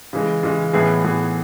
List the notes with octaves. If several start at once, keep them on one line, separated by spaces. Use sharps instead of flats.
C#3 E3 G#3
C#3 E3 G#3
A2 E3 B3 E4 G#4
A2 E3 B3 E4 G#4